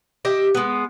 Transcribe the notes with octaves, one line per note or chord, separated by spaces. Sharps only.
G4 D#5 E5
G#3 B3